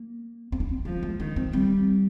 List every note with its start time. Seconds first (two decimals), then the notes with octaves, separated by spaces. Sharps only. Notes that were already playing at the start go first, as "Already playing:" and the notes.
Already playing: A#3
0.52 C4
0.60 D4
0.69 C4
0.85 F3 G#3
1.03 G#3
1.20 D#3 D4
1.36 C4
1.53 G3 C4